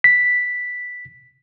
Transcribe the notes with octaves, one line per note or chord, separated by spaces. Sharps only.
B6